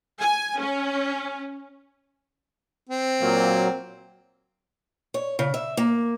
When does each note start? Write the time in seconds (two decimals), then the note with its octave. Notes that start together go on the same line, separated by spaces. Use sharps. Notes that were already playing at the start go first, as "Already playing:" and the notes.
0.20 G#5
0.60 C#4
2.90 C4
3.21 A#2 F#3 A#3
5.14 C#5
5.39 C#3
5.54 E5
5.77 A#3